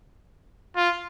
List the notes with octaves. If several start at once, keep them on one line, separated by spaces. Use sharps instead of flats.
F4